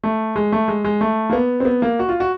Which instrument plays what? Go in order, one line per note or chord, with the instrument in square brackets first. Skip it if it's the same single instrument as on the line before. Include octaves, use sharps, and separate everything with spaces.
[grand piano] A3
G#3
A3
G#3
G#3
A3
A#3
B3
C4
B3
A#3
F#4
F4
F#4